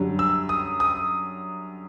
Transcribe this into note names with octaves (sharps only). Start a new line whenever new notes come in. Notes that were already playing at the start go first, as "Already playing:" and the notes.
Already playing: F#2 D3 G3
E6
D#6
D#6